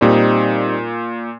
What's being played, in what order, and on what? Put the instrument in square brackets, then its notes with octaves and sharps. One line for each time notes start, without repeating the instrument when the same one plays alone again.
[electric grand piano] A#2 [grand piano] G3 C4 D#4